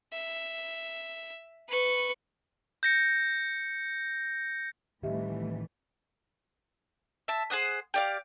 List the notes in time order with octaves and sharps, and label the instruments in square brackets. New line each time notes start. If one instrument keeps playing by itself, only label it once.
[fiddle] E5
B4 C#6
[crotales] G6 A#6 C#7
[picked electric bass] A2 D#3 [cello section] E3 G3 A3 [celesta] G4 D#5 E5
[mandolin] E5 A5
G#4 C5 F#5 D#6
G4 D5 F5